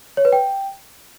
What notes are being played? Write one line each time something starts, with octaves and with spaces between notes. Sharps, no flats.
C#5
B4
G5